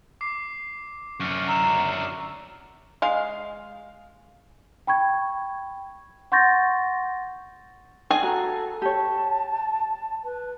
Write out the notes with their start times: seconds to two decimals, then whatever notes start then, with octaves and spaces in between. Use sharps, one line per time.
0.21 D6 C7
1.20 F#2 D3 C#6 F6 C#7
1.48 A#5 C#6 E6 E7
3.02 G#3 F5
4.87 G5 B5 C#6 G#6
6.32 F#5 C6 C#6 G6 A6 A#6
8.10 G#4 G#5
8.23 F#4 A4 A#5
8.82 G4 C#5 A5
10.24 B4